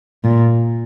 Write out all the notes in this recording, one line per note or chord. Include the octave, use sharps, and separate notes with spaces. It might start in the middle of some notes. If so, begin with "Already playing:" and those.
A#2